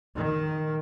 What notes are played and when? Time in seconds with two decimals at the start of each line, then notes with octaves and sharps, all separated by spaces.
0.18 D#3